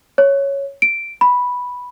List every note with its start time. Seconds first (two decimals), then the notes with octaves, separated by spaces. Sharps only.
0.18 C#5
0.82 D7
1.21 B5